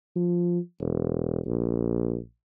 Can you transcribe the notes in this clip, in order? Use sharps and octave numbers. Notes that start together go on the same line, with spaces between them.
F3
E1
A#1